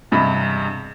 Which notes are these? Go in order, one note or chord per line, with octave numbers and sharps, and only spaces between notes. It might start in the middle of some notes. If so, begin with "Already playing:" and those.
E1 G2 C3 D#5 B5